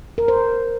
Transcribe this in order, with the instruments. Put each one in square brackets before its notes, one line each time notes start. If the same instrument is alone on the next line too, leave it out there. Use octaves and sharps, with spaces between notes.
[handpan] A#4
C5